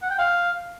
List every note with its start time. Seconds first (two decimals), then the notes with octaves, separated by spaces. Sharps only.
0.02 F#5
0.10 G5
0.18 F5